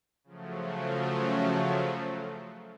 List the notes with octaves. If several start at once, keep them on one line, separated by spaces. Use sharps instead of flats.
C#3 F3 F#3 A3